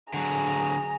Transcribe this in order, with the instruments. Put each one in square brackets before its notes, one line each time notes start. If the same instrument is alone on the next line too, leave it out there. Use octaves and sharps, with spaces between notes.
[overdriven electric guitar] D3 F#3 [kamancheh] G#4 A#5